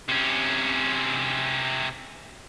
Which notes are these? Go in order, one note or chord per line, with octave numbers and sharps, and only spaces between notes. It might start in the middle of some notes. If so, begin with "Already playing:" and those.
C3 C#4